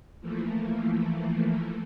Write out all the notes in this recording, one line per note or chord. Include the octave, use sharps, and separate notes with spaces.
E3 F3 A3 A#3